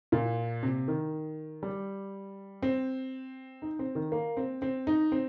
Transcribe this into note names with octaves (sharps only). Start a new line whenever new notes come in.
A#2
C3
D#3
G3
C4
D#4
C4
D#3
A#3
C4
C4
D#4
C4